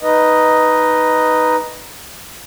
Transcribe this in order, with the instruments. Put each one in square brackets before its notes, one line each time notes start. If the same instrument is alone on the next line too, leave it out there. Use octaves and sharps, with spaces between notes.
[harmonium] D#4 B4 D#5